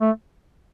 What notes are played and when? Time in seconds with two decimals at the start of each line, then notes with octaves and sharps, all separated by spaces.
0.01 A3